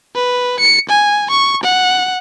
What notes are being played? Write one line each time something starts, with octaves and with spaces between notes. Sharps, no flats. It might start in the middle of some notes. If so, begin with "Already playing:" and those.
B4
C#7
G#5
C#6
F#5